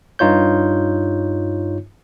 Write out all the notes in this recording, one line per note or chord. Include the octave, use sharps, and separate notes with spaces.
G2 D#4 F4 C#5 G6